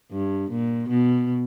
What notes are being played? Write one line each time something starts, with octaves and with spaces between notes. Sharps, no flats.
G2
A#2
B2